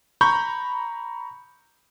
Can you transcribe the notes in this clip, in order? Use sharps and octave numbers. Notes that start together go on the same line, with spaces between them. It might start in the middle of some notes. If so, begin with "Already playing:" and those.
A#5 B5 C#6 G6